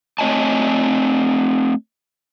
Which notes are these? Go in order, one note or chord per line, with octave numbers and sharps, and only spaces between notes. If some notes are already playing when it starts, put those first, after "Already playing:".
A3 C4 C#5 D#5 G#5 A5